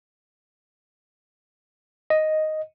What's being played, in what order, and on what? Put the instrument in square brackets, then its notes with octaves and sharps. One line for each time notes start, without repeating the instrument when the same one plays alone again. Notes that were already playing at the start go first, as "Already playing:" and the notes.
[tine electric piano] D#5